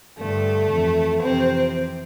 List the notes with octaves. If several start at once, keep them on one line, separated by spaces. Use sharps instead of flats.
G2 D3 A3
F2 E3
F2 C3 E3 C4